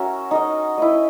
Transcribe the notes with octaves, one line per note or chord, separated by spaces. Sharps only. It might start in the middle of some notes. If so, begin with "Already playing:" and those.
Already playing: C#4 F#4 A#4 E5
D#4 A#4 D#5
E4 B4 D#5